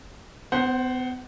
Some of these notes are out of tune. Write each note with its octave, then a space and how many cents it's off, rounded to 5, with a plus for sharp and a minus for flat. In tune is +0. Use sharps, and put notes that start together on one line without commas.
B3 +40 C5 +0 F#5 +0